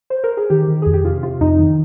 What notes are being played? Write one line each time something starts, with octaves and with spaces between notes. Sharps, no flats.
C5
A#4
G#4
D#3 G4
D#3
F2 G#4
G4
C3 F4
C3 F4
F2 D#4
D#3